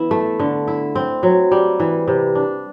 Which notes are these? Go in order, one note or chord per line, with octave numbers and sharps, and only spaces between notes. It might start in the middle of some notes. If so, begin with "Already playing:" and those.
Already playing: E3 B3 E4
A3
D3
E4
C4
F#3
G3
E3
C3
D4